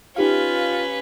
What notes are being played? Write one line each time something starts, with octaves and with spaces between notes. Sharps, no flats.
C#4 D#4 F4 G4 B4 F5